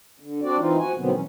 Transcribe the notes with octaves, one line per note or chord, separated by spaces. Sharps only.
D3
C4 D4 F#4 D5
E3 C4 D#4 F4
F3 F#4 G#5
B2 D3 D#3 F#3 B3 C4
B2 E3 F#3 C#4